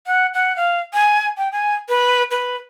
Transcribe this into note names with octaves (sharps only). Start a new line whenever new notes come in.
F#5
F#5
F5
G#5
G5
G#5
B4
B4